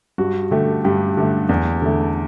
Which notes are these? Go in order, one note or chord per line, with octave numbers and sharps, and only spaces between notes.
G2 F#4
D3 A3 G4
G2 G4
D3 A3
E2
D3 A3